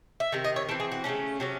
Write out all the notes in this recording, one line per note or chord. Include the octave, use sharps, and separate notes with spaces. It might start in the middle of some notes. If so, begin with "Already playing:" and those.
E5
C3 D#3
D#5
C#5
E3 C4 A4
G#4
F#4
C#3 E3 A3 C#4
C3 F#3 C#4